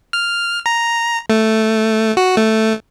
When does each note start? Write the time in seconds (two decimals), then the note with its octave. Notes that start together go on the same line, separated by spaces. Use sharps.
0.13 F6
0.66 A#5
1.30 A3
2.17 F#4
2.37 A3